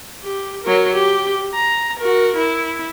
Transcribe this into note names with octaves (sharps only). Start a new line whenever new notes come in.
G4
F#3 A#4
G4
A#5
F#4 A#4
E4